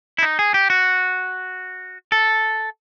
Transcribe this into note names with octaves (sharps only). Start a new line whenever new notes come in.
E4
D#4
G#4
G4
F#4
A4